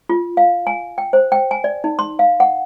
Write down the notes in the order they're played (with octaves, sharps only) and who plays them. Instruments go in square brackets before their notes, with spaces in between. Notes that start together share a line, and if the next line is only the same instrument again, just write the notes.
[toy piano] F4
F5
G#5
G5
C5
G5
G#5
D5
D#4
C6
F5
F#5